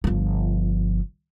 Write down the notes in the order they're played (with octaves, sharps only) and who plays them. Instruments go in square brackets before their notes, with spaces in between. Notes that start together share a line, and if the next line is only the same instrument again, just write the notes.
[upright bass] G1 F3